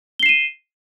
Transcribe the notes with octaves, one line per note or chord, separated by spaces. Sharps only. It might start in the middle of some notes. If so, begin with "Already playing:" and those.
C7 D#7 E7 G7